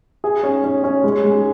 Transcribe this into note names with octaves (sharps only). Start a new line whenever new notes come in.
G#4
C#4
C#4
C#4
G#3
G#3